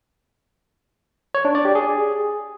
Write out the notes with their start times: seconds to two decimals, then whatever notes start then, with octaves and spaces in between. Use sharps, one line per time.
1.35 C#5
1.45 D4
1.55 D5
1.65 G4
1.75 G#4